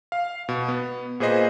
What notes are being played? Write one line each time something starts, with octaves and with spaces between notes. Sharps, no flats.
F5
B2
B3
A#2 G#4 B4 C5 D#5 C7